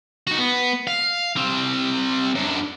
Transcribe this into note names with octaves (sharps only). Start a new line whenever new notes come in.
D#4 F#4
B3
F5
G3 C4
F#2 D4